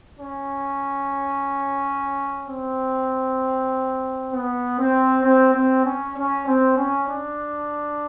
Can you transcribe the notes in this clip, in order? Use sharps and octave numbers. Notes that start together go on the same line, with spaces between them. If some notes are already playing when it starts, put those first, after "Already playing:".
C#4
C4
B3
C4
C4
C4
C#4
C#4
C4
C#4
D4